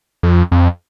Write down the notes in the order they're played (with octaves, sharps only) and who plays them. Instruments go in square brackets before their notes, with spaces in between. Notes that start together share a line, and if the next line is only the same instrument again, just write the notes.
[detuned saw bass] F2
F2